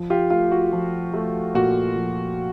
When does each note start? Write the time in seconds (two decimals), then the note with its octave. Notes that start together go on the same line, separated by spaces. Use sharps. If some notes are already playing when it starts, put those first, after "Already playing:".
Already playing: F3
0.10 F4 G4
0.30 A3 F4
0.51 F#4
0.73 F3
1.13 A3
1.54 A#2 F#4
1.96 F3